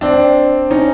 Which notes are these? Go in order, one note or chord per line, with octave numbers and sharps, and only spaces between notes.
C4 D4
C#4 D#4